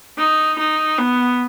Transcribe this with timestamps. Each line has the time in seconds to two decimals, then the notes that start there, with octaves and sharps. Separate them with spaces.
0.18 D#4
0.59 D#4
0.98 B3